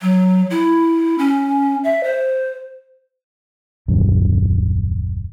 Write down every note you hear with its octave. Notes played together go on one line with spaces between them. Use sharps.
F#3
E4
C#4
E5
C5
D#1 C2 F#2 D3